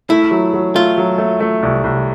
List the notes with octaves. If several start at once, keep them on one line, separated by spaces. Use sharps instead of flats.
A3 E4
F#3
F#3
A3 F4
F#3
A3
A3
C2
C2